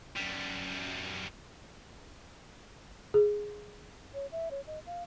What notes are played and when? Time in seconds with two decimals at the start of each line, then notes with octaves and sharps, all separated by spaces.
0.16 F#2 G3
3.14 G#4
4.14 C#5
4.32 E5
4.51 C#5
4.67 D#5
4.86 F5